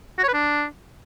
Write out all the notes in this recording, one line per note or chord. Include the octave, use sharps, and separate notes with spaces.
F#4
C#5
B4
D4